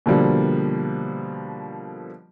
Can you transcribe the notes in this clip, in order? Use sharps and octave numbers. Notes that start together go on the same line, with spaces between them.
B2 D3 F3 G3 A#3